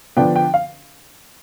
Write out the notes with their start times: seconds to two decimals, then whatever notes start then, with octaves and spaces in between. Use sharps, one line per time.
0.16 D3 F3 B3 D4 G5
0.36 G5
0.54 F5